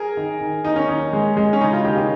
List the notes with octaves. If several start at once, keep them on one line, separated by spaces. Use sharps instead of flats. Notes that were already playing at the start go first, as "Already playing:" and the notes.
Already playing: G#4 A#4
D#3
D#3
D#2 D#4
C#4
D#2 D#4
G#3
G#3
C#4
C#3 D#4
F4
D#2 G4
D#4